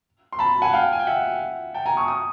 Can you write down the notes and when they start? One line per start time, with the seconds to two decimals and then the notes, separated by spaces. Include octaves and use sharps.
0.32 C6
0.39 A5 B5
0.62 F#5 G#5
0.73 F5 G5
0.92 G#5
0.99 G5
1.07 E5 F#5
1.74 G5 A5
1.86 G#5 A#5
1.97 C#6 D#6
2.08 C#6 D#6